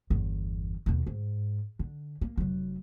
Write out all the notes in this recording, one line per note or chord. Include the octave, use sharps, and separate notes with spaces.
G1 E2
D#2 B2
G#2
D3
A#3
F1 F#3